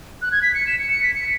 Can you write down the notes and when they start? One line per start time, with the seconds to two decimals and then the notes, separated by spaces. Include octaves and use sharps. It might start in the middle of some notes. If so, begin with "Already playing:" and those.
0.22 F#6
0.32 G#6
0.43 B6
0.55 C#7
0.67 E7
0.79 C#7
0.90 C#7
1.02 B6
1.14 C#7